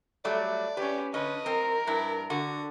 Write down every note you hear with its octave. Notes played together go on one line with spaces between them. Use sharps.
F#3 G3 A3 D5
C#4 G4 B4
D3 C#4 B4 D#5
C4 A#4
G2 E4
D3 F#4